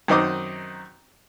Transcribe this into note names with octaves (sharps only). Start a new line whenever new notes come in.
F#2 D#3 C4 D#5 D6 D#6